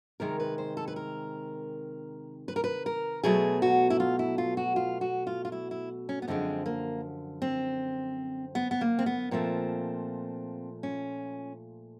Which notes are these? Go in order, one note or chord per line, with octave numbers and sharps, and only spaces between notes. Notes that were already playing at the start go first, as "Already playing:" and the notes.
C3 D#3 G#3 A#4
B4
C5
A4
B4
A#4
B4
A#4
B4
A#4
B2 F#3 A3 G#4
F#4
E4
F4
E4
F4
F#4
F4
F#4
F4
F4
E4
E4
C#4
B3
F#2 D3 F3 G#3 C4
A#3
C4
B3
B3
A#3
C4
B3
A#2 F3 A3 C4
C#4